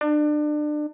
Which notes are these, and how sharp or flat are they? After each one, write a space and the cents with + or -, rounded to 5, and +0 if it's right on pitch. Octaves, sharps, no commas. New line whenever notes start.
D4 +30